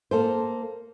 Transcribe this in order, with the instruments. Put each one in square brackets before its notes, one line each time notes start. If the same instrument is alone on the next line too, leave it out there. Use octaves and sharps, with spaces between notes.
[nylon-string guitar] A#3 A4 C5